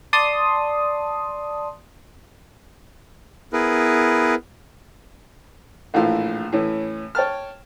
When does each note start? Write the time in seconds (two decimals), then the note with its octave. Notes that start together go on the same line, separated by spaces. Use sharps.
0.13 D5 A5 C6 D#6
3.53 B3 E4 G#4 A#4 B4
5.94 A#1 A2 E3 F4
6.52 A2 E3 C#4
7.15 C#5 G5 A5 F6